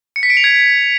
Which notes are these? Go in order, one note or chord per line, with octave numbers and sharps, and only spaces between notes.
C#7
B6
D7
F7
G#6